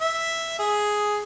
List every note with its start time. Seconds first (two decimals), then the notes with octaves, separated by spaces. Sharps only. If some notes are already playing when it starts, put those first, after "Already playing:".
0.01 E5
0.59 G#4